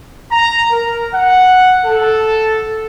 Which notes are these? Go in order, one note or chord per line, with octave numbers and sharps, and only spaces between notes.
A#5
A#4
F#5
A4